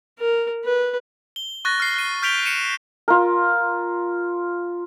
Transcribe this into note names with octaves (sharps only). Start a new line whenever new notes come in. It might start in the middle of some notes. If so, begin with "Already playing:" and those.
A#4
B4
G7
C#6 F#6 A6 A#6
F6 C7
F#6 D#7
F6 G6 B6 D7 F7 G7
C#7 D#7 E7
F4 A#4